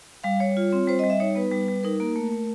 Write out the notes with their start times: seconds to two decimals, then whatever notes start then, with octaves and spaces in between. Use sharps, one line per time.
0.24 G3 F5
0.40 G3 C#5
0.57 F4
0.72 C4
0.87 G3 C5
0.99 G3 D#5
1.10 E5
1.20 D#4 C#5
1.35 B3 B4
1.52 G3
1.68 G3
1.84 D#4 A#4
2.00 A#3
2.16 A3
2.33 A3